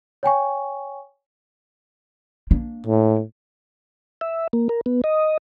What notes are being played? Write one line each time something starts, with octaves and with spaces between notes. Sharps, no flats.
C#5 G5 G#5 C#6
A#3 D4
A2
E5
A#3
A#4
B3
D#5